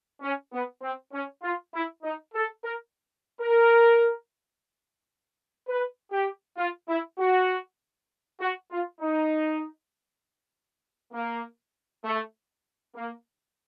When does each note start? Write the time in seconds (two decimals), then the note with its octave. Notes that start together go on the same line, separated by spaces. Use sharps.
0.21 C#4
0.52 B3
0.82 C4
1.13 C#4
1.43 F4
1.74 E4
2.03 D#4
2.34 A4
2.64 A#4
3.40 A#4
5.68 B4
6.12 G4
6.58 F4
6.89 E4
7.18 F#4
8.40 F#4
8.71 F4
9.00 D#4
11.12 A#3
12.04 A3
12.95 A#3